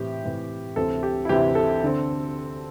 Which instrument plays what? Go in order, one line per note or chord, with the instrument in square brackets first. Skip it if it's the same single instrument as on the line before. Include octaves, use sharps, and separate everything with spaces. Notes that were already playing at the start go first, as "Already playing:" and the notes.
Already playing: [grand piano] A2 E3 C4 G4
A2 E3 C4
D2 C3 E3 C4 A4
G4
E4
D2 C3 E3 C4 G4
A4
D3 C4